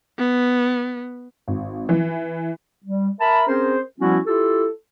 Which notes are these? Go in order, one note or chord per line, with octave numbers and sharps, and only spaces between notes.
B3
G#1
E3
G3
A#4 E5 A5 B5
C4 C#4 G#4 A#4 C5
F3 G3 B3 C#4 E4 F#4
E4 F4 G4 A4